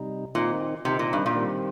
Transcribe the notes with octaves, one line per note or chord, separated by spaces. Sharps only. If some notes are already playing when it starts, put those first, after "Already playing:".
Already playing: C3 G3 D#4
A#2 D#3 C4 D#4
C3 D#3 C4 D#4
A#2
G2
A#2
D#3 G3 C4